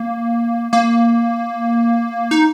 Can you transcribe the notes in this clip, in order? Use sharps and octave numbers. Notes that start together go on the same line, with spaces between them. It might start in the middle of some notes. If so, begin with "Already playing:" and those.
Already playing: A#3
A#3
D#4